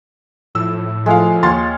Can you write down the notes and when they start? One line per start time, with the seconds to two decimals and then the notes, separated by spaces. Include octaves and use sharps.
0.55 A2 F3 E6
1.06 F3 G#3 A3 F4 F5
1.43 D#2 F4 C#5 C6 A6